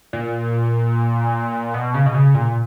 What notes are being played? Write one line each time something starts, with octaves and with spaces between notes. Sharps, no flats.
A#2
B2
C#3
B2
C#3
A#2